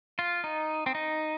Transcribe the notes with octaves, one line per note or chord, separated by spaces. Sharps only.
F4
D#4
C4
D#4